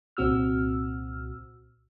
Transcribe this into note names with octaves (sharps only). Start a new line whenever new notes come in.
C2 A#2 C4 F#4 E6 F6